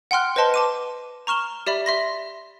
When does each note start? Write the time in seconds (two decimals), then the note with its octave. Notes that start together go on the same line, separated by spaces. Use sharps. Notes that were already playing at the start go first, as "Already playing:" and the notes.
0.11 F#5 G5 C6 F6 F#6
0.36 B4 C5 D#5 A5 C6
0.54 A5 D6 D#7
1.27 A#5 C#6 F6 E7 G7
1.67 G4 D5 E5 B5
1.86 E5 C6 A#6